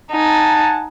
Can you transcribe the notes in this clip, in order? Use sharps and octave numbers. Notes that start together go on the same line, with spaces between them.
D#4 F#5 G#5 A5